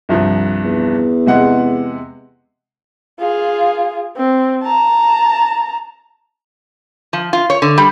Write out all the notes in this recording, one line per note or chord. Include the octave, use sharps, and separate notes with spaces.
C2 G2 F3
E2
C3 G#3 F#5
F4 G#4
C4
A5 A#5
F3
F4
C#5
D3
G3